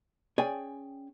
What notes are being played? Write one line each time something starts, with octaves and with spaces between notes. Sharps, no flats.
C#4 G#4 D5 G5 G#5